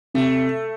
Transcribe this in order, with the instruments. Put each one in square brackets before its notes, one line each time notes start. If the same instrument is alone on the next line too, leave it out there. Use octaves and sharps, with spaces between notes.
[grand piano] C3 [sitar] A3